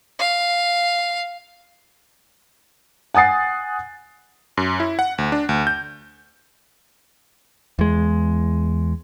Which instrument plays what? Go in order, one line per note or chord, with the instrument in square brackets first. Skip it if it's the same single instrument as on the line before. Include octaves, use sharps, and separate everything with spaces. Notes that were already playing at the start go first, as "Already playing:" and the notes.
[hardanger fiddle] F5
[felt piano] F#5 G#5 D#6 A6 C7
[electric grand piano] F#2
E4
F#5
D2
D4
D2
G6
[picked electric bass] E2 G#3